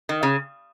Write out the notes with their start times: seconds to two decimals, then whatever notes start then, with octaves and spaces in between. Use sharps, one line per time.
0.09 D#3
0.23 C#3